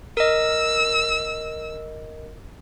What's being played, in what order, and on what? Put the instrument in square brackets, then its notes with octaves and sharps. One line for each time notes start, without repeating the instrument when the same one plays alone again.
[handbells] A#4 D#5 [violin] E6